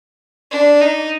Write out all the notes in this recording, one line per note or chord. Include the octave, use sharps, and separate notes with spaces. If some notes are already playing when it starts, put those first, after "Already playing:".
D4
D#4